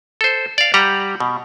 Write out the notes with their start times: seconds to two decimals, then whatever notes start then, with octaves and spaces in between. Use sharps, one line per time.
0.21 A4 C5
0.58 D5 F5
0.74 G3 G4 F#5 A#5
1.20 B2